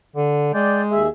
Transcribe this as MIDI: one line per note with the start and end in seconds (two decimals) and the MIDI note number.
0.16 0.53 50
0.54 0.99 56
0.54 0.82 74
0.54 0.82 79
0.91 1.08 39
0.91 1.08 68
0.91 1.08 76